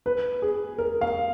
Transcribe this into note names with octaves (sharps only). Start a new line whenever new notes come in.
B4
G#4
A#4
F5